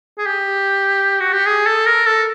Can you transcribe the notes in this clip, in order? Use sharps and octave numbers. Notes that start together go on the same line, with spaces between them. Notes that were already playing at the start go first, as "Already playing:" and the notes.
G#4
G4
F#4
G4
G#4
A4
A#4
A4